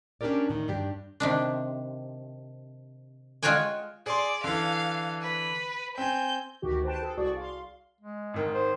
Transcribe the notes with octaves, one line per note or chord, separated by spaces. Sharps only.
C#4 D4 F4 G4 A#4 D5
A2 D#3
G2 D4 G4
C3 D#3 D4
G#3 F4 F#4 C#5 G5 G#5
G#4 D5 C6
D3 E3 F5
B4
C4 G#5 G6
D2 D#3 F#4 G4
B4 C5 G5 A5
G#4 A4
C2 F#4 G#4 D5 C#6
F5 C6
G#3
G#1 G#2 D#3
C5